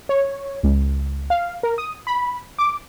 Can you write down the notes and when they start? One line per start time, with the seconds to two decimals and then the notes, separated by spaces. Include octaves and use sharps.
0.09 C#5
0.63 C#2
1.30 F5
1.63 A#4
1.78 D#6
2.07 B5
2.59 D6